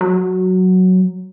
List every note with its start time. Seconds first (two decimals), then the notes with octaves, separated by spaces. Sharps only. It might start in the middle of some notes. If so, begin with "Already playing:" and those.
0.01 F#3